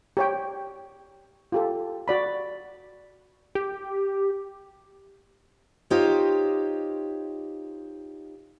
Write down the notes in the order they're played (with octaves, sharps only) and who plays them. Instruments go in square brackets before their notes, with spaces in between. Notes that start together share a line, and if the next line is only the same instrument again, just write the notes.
[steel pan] G4 C#5 G5
F4 G4 A4
F#4 D5 B5
[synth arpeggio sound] G4
[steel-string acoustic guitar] D#4 F4 G4 C5 C#5 D#5